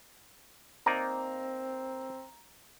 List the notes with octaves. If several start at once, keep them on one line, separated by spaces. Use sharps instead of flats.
A#3 C4 D#4 D5 A#5